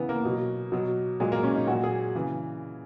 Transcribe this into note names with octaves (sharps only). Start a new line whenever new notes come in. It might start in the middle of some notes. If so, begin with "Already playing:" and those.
Already playing: C#3 E3 B3 E4
A#3
B2 F#3
B2 F#3
A#2 F#3 G#3
A#3
C#4
D#4
A#2 F#3 F#4
G#4
C#3 E3